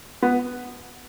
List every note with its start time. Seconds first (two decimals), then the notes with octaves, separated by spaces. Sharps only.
0.22 B3